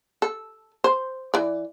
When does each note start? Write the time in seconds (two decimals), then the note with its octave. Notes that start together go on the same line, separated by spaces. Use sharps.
0.22 A4
0.84 C5
1.34 E3 D5